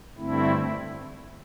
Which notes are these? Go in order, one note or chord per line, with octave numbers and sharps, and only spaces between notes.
G2 D3 A3 C4 E4